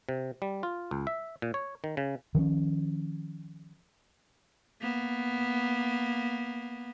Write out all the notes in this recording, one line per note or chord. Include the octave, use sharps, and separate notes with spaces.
C3
G3
F4
C#2
E5
A#2
C#5
D#3
C#3
D#3 F3 C4 C#4
A#3 B3